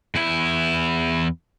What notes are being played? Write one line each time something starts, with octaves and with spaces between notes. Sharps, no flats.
E2 E4